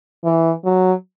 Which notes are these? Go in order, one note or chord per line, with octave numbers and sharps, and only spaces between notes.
E3
F#3